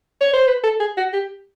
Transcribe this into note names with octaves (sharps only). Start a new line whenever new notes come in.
C#5
C5
B4
A4
G#4
F#4
G4